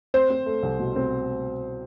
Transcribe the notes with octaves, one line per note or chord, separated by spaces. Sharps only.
C4 C5
C4
A3
C2
B2
C4